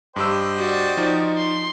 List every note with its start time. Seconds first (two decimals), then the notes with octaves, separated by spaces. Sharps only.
0.16 G2 G4 C5 D#5 G5 E6
0.55 F#4 D5
0.97 F3 D#4
1.37 C6